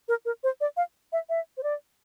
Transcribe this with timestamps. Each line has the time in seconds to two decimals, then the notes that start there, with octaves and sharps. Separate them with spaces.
0.08 A#4
0.25 A#4
0.44 C5
0.61 D5
0.77 F5
1.13 E5
1.29 E5
1.57 C5
1.63 D5